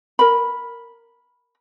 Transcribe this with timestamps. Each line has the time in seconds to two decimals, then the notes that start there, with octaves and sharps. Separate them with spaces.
0.19 A#4 B5